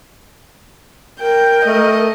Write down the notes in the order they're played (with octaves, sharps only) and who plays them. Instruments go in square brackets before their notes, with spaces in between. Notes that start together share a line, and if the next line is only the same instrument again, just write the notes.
[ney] A#4 [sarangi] G5
[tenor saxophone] A3 [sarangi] D#5